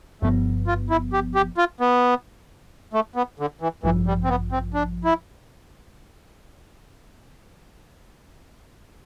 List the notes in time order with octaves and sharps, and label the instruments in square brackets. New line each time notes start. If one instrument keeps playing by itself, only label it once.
[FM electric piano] G1 G2 F3 B3 [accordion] A3
[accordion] F4
E4
G4
G4
F4
B3
A3
B3
D3
E3
[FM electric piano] A1 G2 F3 [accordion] E3
[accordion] G3
C4
B3
C4
D4
E4